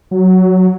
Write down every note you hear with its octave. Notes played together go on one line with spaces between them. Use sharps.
F#3